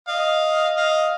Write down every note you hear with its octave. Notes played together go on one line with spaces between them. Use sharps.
D#5 F5
D#5 F5